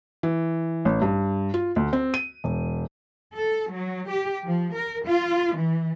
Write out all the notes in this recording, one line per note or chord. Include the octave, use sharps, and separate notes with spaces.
E3
A1
G2
F4
D2
C4
D#7
E1
A4
F#3
G4
F3
A#4
F4
E3